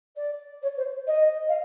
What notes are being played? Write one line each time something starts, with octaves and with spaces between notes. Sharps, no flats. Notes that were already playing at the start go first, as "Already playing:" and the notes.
D5
C#5
C5
D#5
F5